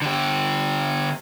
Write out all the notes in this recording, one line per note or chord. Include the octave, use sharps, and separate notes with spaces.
D3 G4